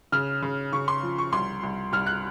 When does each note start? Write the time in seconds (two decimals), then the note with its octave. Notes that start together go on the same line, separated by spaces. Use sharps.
0.12 C#3 F6
0.42 C#3
0.73 C#3 C#6
0.88 C6
1.03 F3
1.18 C#6
1.32 C2 C6
1.63 C2
1.92 C2 F6
2.07 F#6